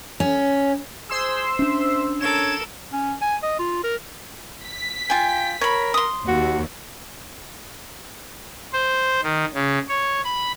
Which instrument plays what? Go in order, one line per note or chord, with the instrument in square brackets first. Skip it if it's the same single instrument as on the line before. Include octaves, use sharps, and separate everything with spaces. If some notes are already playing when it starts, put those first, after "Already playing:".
[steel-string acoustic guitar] C#4
[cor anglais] G#4 [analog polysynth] C5 C6 E6
[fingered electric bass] C#4 D4 [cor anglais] E5
[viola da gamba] A4 A#4 [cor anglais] C#5 [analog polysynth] E7
[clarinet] C#4
G#5
D#5
F4
A#4
[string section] B6
[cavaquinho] F4 G#5 [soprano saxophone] G5
[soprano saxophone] A#4 [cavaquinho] C#5 B5
[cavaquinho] C6 D#6
[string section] D#2 [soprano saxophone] F#4
[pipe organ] C5
D#3
C#3
C#5
B5